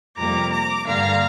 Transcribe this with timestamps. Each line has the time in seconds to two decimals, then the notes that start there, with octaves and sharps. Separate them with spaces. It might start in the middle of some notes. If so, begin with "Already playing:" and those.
0.17 F2 C3 G3 A#3 A#5 D6
0.52 A#5 D6
0.87 G2 D3 A#3 F5 A#5